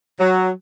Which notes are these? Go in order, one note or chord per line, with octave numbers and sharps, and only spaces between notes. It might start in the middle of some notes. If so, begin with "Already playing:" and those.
F#3